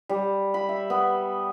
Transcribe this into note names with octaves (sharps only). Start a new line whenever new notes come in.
G3
B5
E5
B3